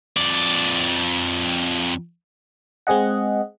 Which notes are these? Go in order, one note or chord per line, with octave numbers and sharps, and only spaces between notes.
F2 D5
G#3 C4 G#4 D#5 F#5